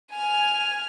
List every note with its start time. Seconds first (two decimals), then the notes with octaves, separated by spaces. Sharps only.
0.12 G#5 F6